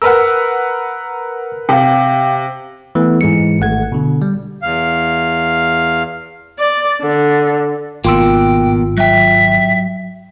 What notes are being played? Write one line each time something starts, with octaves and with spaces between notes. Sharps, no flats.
A#4 B4 F#5 E6 F6
C3 F5 G5
E3 A3 B3
G#2 E3 G#3 C#7
G#1 A3 F#5 G#6
B2 D3
G3
E2 F5
D5
D3
G#1 B2 A#3 F4 G5 C6 E6
F#3 E5 G5